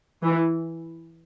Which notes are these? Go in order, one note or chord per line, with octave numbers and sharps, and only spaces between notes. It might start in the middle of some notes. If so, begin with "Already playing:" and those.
E3